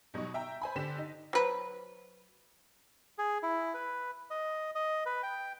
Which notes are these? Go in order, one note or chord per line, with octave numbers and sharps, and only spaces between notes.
B2 F#3 G3 D#4 C#6
E5 G5 A#5
C5 G#5 B5
D3 G4 C5 B6 E7
D#4
F#3 B4 C5
G#4
E4
B4
D#5
D#5
B4
G5